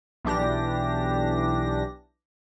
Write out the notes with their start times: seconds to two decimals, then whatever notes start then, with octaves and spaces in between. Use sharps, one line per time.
0.25 B1 E3 D4 G4 A#6